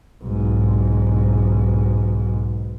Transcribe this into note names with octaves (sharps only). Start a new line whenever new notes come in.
B1 G#2